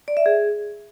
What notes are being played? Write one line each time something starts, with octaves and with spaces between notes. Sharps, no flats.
D5
E5
G#4